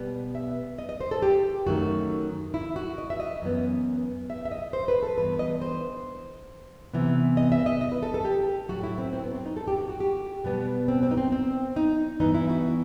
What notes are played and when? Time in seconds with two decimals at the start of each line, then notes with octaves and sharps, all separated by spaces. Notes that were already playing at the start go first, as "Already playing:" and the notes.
Already playing: B2 G3 B3
0.35 E5
0.78 D#5
0.89 D#5
1.01 C5
1.11 A4
1.22 G4
1.66 F#2 D#3 A3 F#4
2.54 E4
2.76 F#4
2.98 D#5
3.10 E5
3.20 D#5
3.42 F#2 E3 B3
4.30 E5
4.45 E5
4.51 D#5
4.73 C5
4.88 B4
5.03 A4
5.17 G2 E3 B3 B4
5.39 D#5
5.62 C5
6.94 C3 E3 B3
7.37 D#5
7.52 E5
7.66 D#5
7.81 D#5
7.92 B4
8.03 A4
8.14 A4
8.25 G4
8.69 A2 F#3 A3 F#4
8.83 E4
8.98 C4
9.13 C4
9.24 B3
9.35 C4
9.46 D#4
9.57 A4
9.68 G4
9.78 F#4
9.89 F#4
10.00 G4
10.44 B2 G3 B3
10.88 C4
11.03 C4
11.11 D#4
11.17 C4
11.32 C4
11.76 D#4
12.20 G2 E3 B3 D#4
12.35 E4
12.49 F#4